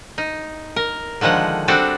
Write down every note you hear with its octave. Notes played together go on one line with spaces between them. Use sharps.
D#4
A#4
D3 D#3 F3 G#3 F#5
G3 C4 D4 F#4 A4